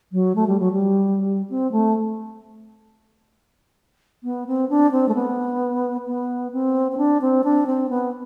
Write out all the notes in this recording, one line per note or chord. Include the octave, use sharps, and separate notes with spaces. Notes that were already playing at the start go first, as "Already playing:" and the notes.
F#3
A3
G3
F#3
G3
C4
A3
B3
C4
D4
C4
A3
B3
B3
C4
C4
D4
C4
D4
C4
B3